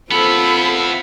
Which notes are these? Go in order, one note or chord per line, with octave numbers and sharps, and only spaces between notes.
B3 C4 E4 F4 A4 C5 B5